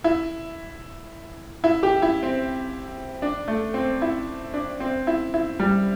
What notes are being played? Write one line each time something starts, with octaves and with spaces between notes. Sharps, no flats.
E4
E4
G4
E4
C4
D4
A3
C4
E4
D4
C4
E4
E4
G3